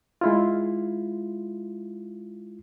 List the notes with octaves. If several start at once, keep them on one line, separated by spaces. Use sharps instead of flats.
G#3 E4 F4